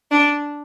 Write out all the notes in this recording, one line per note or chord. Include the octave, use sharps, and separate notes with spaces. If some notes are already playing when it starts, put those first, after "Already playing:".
D4